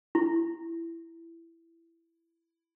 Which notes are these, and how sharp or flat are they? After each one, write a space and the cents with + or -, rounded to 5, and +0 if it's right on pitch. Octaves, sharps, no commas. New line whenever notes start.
E4 +15